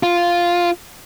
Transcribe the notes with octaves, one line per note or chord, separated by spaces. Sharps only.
F4